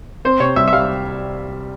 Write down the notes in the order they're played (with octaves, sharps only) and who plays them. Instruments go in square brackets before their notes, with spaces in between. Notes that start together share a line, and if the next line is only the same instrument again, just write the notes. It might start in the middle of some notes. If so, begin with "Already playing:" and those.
[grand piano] C4 [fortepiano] C5
[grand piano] C3 [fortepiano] C#5
[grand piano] C2 [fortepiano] E5
[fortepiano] E5
[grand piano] G3 [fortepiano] F5